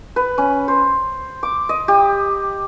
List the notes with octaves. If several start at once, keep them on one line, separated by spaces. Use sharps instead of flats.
B4
C#4
C5
D6
D#5
G4